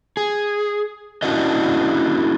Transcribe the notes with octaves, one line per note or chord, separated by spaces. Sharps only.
G#4
C#4 D4 E4 F#4 A#4 D#5